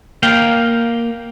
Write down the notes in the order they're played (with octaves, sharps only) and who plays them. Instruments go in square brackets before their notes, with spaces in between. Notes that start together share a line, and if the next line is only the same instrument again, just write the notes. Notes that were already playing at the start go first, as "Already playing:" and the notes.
[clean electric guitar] A#3 F5 G5